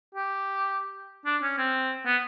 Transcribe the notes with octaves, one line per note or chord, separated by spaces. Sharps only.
G4
D4
C#4
C4
B3